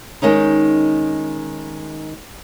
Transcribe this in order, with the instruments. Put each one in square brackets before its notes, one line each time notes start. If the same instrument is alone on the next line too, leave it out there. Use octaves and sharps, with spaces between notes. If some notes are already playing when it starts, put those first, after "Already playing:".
[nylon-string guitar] D#3 G#3 C#4 D#4